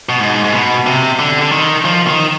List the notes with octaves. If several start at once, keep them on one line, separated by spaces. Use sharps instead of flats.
B2
G#2
G#2
B2
C3
D3
D3
D#3
F3
D#3